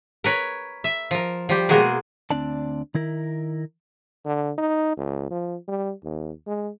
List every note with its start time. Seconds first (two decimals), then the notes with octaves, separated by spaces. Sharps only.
0.24 A#4 B4 C#5
0.84 E5
1.11 F3 A#4
1.49 F3 G3 G4
1.69 B2 G#3 A#3 F#4 G#4 A#4
2.31 D2 F#3 C4 D4 D5 A5
2.94 D#3 E4 A#4
4.25 D3
4.58 D#4
4.97 C#2
5.31 F3
5.68 G3
6.04 D#2
6.47 G#3